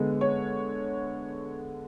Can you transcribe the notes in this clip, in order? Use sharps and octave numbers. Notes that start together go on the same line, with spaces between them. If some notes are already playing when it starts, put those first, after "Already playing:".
Already playing: D3 G#3 B3
C#5